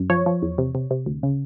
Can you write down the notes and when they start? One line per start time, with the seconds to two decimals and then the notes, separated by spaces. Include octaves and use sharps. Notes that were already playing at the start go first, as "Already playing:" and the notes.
Already playing: F#2
0.10 F3 C#5
0.26 F3
0.42 E2
0.58 C3
0.75 C3
0.91 C3
1.06 D2
1.23 C#3